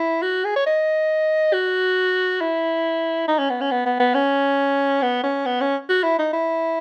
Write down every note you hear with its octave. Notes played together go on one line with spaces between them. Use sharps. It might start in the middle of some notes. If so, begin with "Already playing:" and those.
Already playing: E4
F#4
G#4
C#5
D#5
F#4
E4
D#4
C#4
B3
C#4
B3
B3
B3
C#4
B3
C#4
B3
C#4
F#4
E4
D#4
E4